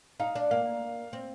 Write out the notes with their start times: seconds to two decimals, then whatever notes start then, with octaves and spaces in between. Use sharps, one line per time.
0.20 D#4 F5
0.35 D4
0.51 A#3 F5
1.13 C4